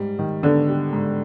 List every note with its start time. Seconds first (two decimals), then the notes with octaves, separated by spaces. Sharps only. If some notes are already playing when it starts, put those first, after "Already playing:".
Already playing: G#2 G3
0.19 D#3
0.43 D3 B3
0.69 G3
0.93 G#2